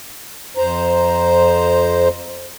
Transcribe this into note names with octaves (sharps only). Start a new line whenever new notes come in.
F2 C5 A#5